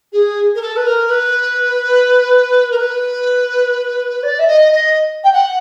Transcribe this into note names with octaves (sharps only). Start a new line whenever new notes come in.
G#4
A#4
A4
B4
A#4
B4
A#4
B4
D5
E5
D#5
D#5
G5
F#5